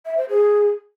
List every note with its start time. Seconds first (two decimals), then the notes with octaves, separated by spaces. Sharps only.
0.06 E5
0.17 C5
0.29 G#4